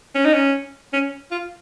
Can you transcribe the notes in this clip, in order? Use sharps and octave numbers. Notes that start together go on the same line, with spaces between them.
C#4
D#4
C#4
C#4
F4